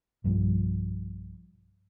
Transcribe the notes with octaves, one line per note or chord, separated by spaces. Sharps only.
B1 G2 F3 G3